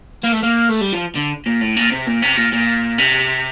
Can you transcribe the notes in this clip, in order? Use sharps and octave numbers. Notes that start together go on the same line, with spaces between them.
A#3
A3
A#3
A3
G3
F3
D3
A#2
A2
A#2
C3
A#2
C3
A#2
A#2
C3